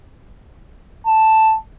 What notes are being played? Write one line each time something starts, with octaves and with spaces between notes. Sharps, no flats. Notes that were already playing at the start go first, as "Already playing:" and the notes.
A5